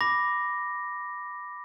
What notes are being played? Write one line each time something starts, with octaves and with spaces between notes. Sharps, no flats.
B5 D6 A#6